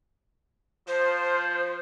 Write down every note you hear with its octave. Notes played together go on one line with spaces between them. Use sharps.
F3 C5